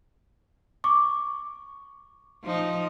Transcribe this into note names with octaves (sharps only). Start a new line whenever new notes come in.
C#6 D6
F3 D#4